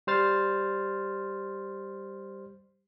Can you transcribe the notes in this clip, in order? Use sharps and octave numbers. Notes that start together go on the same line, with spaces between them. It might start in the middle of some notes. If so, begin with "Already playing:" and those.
G3 C5 F6 A6